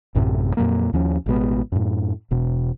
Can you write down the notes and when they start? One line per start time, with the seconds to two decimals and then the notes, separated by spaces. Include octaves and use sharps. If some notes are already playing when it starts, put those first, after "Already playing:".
0.15 A1 F#2 A2 C3
0.57 F2 A#2 F#3 A#3
0.93 D#2 F3 C#4
1.26 A1 B2 G#3 B3
1.72 F#2 A2
2.31 E1 B2